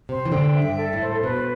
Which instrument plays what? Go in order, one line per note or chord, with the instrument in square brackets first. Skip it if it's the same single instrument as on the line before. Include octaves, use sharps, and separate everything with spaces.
[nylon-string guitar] C3 [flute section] C5
[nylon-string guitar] E3
[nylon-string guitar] D3 [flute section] G5
[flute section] E5
[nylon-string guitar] G2
[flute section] A4
[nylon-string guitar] A2
[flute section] C5
[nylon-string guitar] B2 [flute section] B4